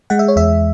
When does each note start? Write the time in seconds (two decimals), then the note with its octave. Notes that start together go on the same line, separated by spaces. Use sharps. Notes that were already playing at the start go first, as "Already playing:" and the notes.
0.10 G#3 F#5
0.19 E5
0.28 C#5
0.36 E2 E5